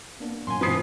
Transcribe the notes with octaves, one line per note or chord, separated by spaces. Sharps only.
A#3 B3 D4
F#2 A#2 G#5 C6
G2 B2 E3 F3 B4 D#6 C7